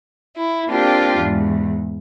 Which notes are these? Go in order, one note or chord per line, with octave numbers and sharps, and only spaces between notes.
E4
A#3 C4 D4 F4 G4
E2 G#2